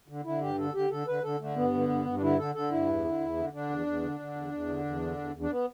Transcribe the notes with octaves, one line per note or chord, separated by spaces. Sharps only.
D3
D3 E4
G2 G4
D3 A4
D3 G4
D3 A4
D3 B4
D3 A4
D3 A3
G2 B3
D3
G2
G2
D4
D3 E4
D3 A4
D3 A4
G2 E4
E2
D3
E2
D3
D3 D4
E2
E2
D3
D3
E2
E2
D3
E2
D3
E2
E2
D4
B3